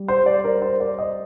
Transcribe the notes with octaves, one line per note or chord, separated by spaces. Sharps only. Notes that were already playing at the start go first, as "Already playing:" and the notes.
Already playing: G3
C5
D5
A#4
C5
D5
D#5